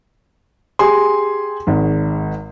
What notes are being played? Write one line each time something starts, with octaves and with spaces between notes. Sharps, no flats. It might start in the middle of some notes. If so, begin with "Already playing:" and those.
G4 G#4 G#5 C6
G#1 G#2